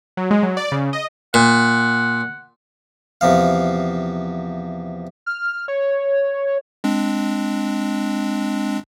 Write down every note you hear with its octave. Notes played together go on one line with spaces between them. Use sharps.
F#3
G#3
F#3
D5
C#3
D#5
A#2 F#5
E2 C3 F3 F5
F6
C#5
G#3 C4 D4